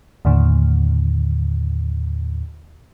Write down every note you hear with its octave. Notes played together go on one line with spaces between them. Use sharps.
D#2 A2 D3